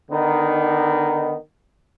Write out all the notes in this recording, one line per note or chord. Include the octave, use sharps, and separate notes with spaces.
D3 D#3 B3 D#4